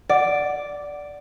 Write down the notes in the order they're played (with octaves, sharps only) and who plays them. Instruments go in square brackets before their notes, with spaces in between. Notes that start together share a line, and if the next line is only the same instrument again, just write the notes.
[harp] D5 [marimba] F#5